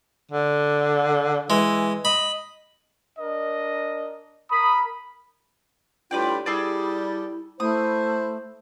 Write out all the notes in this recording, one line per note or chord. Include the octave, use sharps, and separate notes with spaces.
D3
E3 G#3
D#5 B5
D4 A#4 D#5
A#4 B5 D#6
A2 G3 D4 F4 B4 D5 G5
G3 E4 G#4 A4 D5
A3 E4 C5 D#6